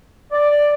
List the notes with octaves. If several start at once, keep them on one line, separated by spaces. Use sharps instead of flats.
D5